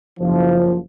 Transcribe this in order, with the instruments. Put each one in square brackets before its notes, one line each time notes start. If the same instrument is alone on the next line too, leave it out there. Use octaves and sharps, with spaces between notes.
[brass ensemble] F#1 F3